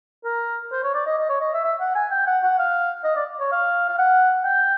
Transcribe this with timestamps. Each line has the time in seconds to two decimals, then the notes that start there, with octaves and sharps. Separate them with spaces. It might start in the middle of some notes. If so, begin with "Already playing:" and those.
0.24 A#4
0.72 C5
0.84 C#5
0.94 D5
1.06 D#5
1.18 D#5
1.29 C#5
1.41 D#5
1.54 E5
1.64 E5
1.80 F#5
1.95 G#5
2.11 G5
2.27 F#5
2.43 F#5
2.59 F5
3.04 D#5
3.16 D5
3.40 C#5
3.52 F5
3.89 F5
3.99 F#5
4.44 G5